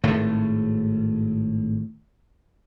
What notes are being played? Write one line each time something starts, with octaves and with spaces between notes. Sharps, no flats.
G#1 A2 A3